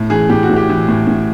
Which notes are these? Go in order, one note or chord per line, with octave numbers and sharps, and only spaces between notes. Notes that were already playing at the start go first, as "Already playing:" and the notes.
Already playing: A2
E3 G#4
A2 G4
F#4
A2
G4
E3
A2
A2